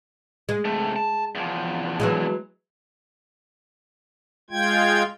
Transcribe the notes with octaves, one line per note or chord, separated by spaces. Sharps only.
G#3
C3 A3
A5
E2 F3
E3 F#3 G#3
G#3 F4 G5 G#6